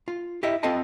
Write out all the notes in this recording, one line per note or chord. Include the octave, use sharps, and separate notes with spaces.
F4
E4 G4 D#5 E5
C4 F4 A4 D#5 A5